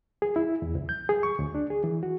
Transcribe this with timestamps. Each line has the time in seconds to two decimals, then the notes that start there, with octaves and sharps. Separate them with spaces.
0.22 G#4
0.36 E4
0.62 E2
0.75 C#2
0.89 G6
1.09 G#4
1.23 C#6
1.39 D2
1.55 D4
1.70 G#4
1.84 E3
2.03 F#4